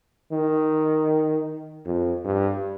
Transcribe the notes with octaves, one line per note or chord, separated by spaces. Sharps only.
D#3
F2
G2